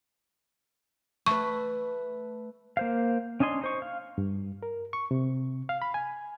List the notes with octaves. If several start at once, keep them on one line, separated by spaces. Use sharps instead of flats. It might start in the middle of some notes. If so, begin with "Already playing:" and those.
A3 B4 C#6
A#3 C5 F5
C#4 D4 D#5 G#5 C6
D#4 C5 C#6
F5
G2
A#4
C#6
C3
F5
B5
G#5